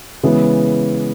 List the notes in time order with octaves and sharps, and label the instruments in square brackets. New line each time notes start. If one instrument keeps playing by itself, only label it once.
[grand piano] C#3 E3 G#3 B3